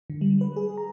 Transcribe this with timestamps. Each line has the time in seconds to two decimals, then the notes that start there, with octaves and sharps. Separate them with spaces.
0.10 D3
0.21 G3
0.41 B4
0.56 G#4
0.77 A#5